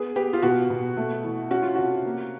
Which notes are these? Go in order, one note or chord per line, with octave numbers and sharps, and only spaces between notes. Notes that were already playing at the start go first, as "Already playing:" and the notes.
Already playing: B3 G#4
B3 G4
F4
B2 F#4
B2
A3
E3
C#4 F#4
F4
C3 F#4
A#3